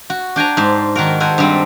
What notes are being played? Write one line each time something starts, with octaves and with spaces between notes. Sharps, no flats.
F#4
D4 G5 G#5 A#5
G#2 C5
D#3 F#4 A#4
A4 A#4 C5 F#5 G#5
G2 G3 C4